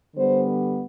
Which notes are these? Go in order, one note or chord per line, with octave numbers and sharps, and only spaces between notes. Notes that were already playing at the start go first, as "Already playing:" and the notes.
D3 G3 B3 C5